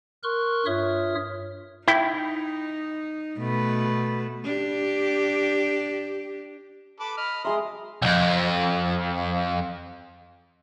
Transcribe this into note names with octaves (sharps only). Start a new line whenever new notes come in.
A#4 C6 C#6 F6 F#6
G2 F4 C#5 E5 D#6 F6
D#4 E4 G5
B2 A3 B4
D4 G4
A4 B4 D6
D#5 B5 F6
G#3 G#4 E5 A#5 C6
B1 F2